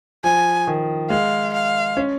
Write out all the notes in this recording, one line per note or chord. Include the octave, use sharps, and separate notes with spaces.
F3 G#5
D#3
G#3 F5
F5
C#4